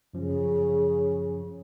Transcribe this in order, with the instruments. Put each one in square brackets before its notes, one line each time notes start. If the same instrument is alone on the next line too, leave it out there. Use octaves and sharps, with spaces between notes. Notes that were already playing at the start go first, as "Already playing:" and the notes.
[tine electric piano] F#2 F3 C#4 [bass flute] C#3